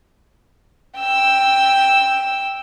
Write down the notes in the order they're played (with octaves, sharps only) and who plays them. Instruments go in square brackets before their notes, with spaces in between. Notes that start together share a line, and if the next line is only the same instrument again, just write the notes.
[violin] G5 E6